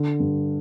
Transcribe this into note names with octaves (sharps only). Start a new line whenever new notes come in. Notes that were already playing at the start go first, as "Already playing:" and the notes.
Already playing: D3
G2